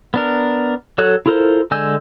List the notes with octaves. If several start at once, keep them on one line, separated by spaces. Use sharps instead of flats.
B3 D4 A#4
F#3 F#4 A4 C#5 F#6
E4 F4 A4 A#4 C5
D3 G#3 G#5 E6 G6